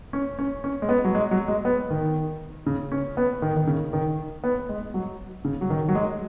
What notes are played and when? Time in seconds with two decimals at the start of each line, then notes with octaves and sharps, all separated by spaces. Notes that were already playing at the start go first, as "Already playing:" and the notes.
0.13 C#4
0.39 C#4
0.64 C#4
0.82 G#3
0.89 B3
1.04 F#3
1.15 G#3
1.31 F#3
1.48 G#3
1.65 B3
1.90 D#3
2.66 C#3
2.92 C#4
3.17 B3
3.42 D#3
3.57 D#3
3.67 C#3
3.93 D#3
4.44 B3
4.69 G#3
4.94 F#3
5.45 C#3
5.61 F#3
5.70 D#3
5.88 F#3
5.95 G#3